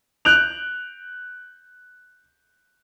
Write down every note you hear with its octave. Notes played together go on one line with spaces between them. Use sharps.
F#6 G6 D7 F7